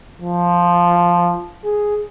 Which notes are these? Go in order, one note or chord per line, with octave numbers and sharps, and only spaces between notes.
F3
G#4